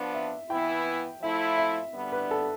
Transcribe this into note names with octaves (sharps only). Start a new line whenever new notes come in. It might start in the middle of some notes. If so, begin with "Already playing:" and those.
Already playing: F3 B3 D4
E5
E3 B3 E4 G5
F3 A3 E4 E5
E5
D3 G3 B3 D4
B4
A4